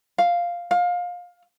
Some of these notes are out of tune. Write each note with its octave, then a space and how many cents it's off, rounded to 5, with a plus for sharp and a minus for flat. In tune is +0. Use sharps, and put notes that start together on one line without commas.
F5 +0
F5 +25